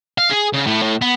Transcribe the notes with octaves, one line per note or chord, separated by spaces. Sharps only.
F5
G#4
C#3
A2
A2
B3